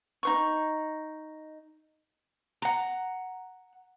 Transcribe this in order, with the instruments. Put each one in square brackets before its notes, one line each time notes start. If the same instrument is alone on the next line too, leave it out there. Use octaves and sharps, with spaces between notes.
[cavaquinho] D#4 C5 C#6
[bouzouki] F#5 A#5